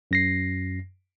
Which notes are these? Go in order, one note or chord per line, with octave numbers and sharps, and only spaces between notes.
F#2 A#6 C7